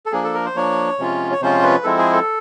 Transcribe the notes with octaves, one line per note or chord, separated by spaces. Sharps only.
A4
F3 A#3 D4 G#4
A4
A#4
C5
F3 A#3 D4 C#5
C3 F3 G#3 C#4 F4
C#5
C3 F3 G#3 C#4 F4 C5
B4
F3 G#3 C4 E4 A4
G#4
A4